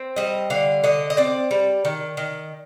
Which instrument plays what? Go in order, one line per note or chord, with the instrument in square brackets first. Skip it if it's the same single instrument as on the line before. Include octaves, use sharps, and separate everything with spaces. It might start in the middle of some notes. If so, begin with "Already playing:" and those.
Already playing: [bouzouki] C4
G3 D#5
D3 F5
D3 D#5
D#5
C4 D5
G3
D#3
D#3